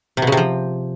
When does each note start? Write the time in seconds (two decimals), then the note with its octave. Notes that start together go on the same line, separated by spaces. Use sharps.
0.17 C3
0.22 B2
0.27 C#3
0.32 C3
0.37 F3